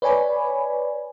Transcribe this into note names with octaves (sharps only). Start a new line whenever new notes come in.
B4 C#5 D5 G#5 B5